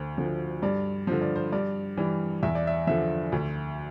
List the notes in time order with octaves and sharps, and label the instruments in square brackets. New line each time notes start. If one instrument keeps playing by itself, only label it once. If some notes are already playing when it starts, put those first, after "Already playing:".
Already playing: [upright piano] D2 C5
D3 F3
G2 D5
D3 F3 C5
D5
C5
G2 D5
E3 G3
E2 E5
D5
E5
D3 F3 E5
D2